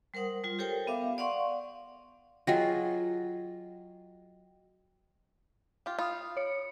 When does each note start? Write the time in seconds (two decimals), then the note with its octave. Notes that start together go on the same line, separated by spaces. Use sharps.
0.14 G3 A#4 C5 F#5 D#6
0.44 G3 F4
0.59 G4 A4 A#4 C5 C#5 G5
0.87 B3 E5 F5 D6
1.18 D5 F5 F#5 C6 C#6
2.47 F#3 F4 G#4 D#5 G5 A#6
5.86 F4 G4
5.99 F4 B5 D#6
6.37 C#5 C#7